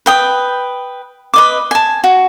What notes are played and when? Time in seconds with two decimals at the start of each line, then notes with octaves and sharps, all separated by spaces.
0.06 B4 G5 D#6
1.34 B4 D#5 D6
1.71 G#5 A5
2.04 F#4